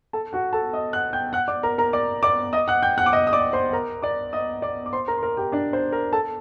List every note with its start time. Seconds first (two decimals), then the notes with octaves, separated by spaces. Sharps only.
0.13 A4 A5
0.33 F#4 F#5
0.53 A4 A5
0.73 D#5 D#6
0.93 F#5 F#6
1.13 G5 G6
1.33 F#5 F#6
1.48 D5 D6
1.63 A#4 A#5
1.78 A#4 A#5
1.93 D5 D6
2.23 D5 D6
2.53 D#5 D#6
2.68 F#5 F#6
2.83 G5 G6
2.98 F#5 F#6
3.06 D6
3.13 D#5 D#6
3.27 D#6
3.33 D5 D6
3.53 C5 C6
3.73 A#4 A#5
4.02 D5 D6
4.33 D#5 D#6
4.62 D5 D6
4.86 D6
4.93 C5 C6
5.08 A#4 A#5
5.17 C6
5.23 A#4 A#5
5.37 G4 G5
5.52 D4 D5
5.73 C5
5.93 A#4
6.13 A4 A5